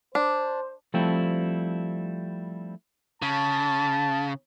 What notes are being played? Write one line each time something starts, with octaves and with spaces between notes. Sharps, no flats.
D4 C5
F3 G3 A3 C4 E4
C#3 A5